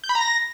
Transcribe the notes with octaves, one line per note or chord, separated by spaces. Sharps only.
G6
B5
A#5
A#6